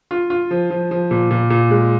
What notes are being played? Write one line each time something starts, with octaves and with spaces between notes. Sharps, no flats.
F4
F4
F3
F3
F3
A#2
A#2
A#2
G#3